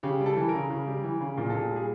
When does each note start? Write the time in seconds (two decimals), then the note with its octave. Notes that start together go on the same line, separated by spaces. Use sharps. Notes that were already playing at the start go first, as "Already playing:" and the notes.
0.03 C#3 G4
0.20 G3
0.26 A4
0.37 E3
0.42 A4
0.48 A#4
0.54 C#3
0.70 C#3
0.87 G3
1.04 E3
1.21 C#3
1.37 A#2 G#4
1.50 A#2 A4
1.60 G#4
1.71 G3
1.76 G#4